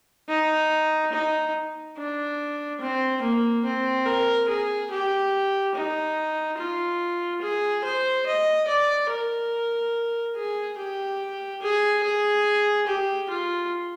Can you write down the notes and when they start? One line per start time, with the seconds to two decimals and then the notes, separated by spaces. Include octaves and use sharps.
0.29 D#4
1.13 D#4
1.97 D4
2.81 C4
3.22 A#3
3.65 C4
4.06 A#4
4.48 G#4
4.91 G4
5.75 D#4
6.58 F4
7.42 G#4
7.84 C5
8.26 D#5
8.68 D5
9.10 A#4
10.36 G#4
10.78 G4
11.62 G#4
12.03 G#4
12.87 G4
13.30 F4